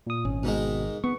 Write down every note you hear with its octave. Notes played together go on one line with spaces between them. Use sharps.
A#2 D#6
G#1 C#4
G#2 B2 D#3 G#3
B3 C#6